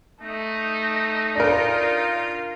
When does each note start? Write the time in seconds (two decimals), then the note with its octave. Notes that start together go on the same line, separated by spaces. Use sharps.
0.21 A3 D#4
1.36 D4 F4 A#4 F5